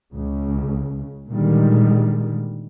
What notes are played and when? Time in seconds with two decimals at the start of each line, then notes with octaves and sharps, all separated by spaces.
0.15 C#2 C#3
1.31 A#2 D3 D#3 G3 G#3